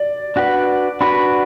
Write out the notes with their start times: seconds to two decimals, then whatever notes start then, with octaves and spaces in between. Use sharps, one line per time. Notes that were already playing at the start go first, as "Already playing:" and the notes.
Already playing: D5
0.36 D4 F#4 B4 D5 F#5
1.01 D4 F#4 B4 D5 B5